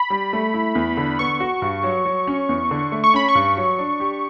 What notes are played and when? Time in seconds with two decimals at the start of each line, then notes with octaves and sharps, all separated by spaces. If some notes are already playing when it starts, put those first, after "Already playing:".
Already playing: B5
0.10 G3
0.33 A3
0.54 E4
0.75 E2
0.97 D3
1.19 B3 C#6
1.40 F#4
1.62 G2
1.83 F#3
2.06 F#3
2.27 C#4
2.49 E2
2.71 D3
2.92 A3
3.04 C#6
3.14 C#4 B5
3.29 C#6
3.35 G2
3.57 F#3
3.79 D4
4.00 G4